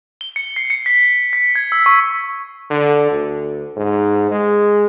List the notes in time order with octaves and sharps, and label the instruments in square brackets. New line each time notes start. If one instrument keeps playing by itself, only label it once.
[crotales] G7
C#7
C7
C#7
B6
B6
G#6
E6
C#6
[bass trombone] D3
D2
G#2
G#3